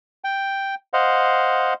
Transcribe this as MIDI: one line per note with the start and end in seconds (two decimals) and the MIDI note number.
0.24 0.75 79
0.93 1.74 72
0.93 1.74 75
0.93 1.74 77
0.93 1.74 78